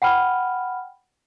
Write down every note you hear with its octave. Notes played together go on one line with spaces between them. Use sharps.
F#5 G5 B5 F6